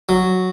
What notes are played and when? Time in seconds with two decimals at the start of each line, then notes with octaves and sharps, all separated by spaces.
0.09 F#3